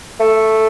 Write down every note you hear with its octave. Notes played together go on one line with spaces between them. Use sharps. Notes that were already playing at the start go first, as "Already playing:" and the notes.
A3